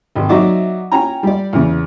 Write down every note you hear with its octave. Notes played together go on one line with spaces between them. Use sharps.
G#1
F#3 D#4 F#4 D5 E5 D6
C#4 G5 G#5 A#5
G3 D5
E2 C#3